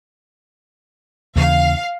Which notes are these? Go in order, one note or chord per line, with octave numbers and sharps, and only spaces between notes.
D#2 C#3 E3 F5